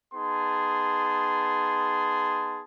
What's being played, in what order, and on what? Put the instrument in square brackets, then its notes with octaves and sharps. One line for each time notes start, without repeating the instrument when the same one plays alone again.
[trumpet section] B3 D#4 G#4 A5 C6